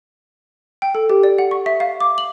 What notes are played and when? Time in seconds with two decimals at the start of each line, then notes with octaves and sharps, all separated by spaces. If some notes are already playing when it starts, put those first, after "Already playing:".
0.82 G5
0.95 A4
1.10 G4
1.23 D5
1.39 F#5
1.51 C#6
1.66 E5
1.80 F5
2.01 D6
2.18 F#7